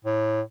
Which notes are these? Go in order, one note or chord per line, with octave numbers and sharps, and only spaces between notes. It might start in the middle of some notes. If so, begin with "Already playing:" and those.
A2